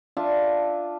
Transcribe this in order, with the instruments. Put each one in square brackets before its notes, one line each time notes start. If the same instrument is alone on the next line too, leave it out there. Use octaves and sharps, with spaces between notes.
[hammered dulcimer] D4 F4 E5 A5